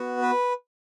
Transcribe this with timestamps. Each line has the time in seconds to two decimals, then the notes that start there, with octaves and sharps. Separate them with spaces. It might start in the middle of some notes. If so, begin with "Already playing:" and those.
Already playing: B3 F#4
0.22 B4